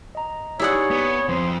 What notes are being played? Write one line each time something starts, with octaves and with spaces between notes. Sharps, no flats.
D#5 A#5
D#4 E4 G4 G#4 C#5 D5 F#5
B3 D#6
F2 C5